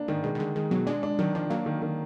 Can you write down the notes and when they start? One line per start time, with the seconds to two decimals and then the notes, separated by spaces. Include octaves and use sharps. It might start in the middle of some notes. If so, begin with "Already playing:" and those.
Already playing: A#3 D4
0.08 G#2 D#3
0.23 B2 G#3
0.35 B2
0.39 D3 G#3
0.56 D#3 G#3
0.71 B2 F#3
0.87 G#3 D4
1.03 D4
1.19 D#3 F#3
1.35 F3 D4
1.50 F#3 A#3
1.66 D#3
1.82 D#3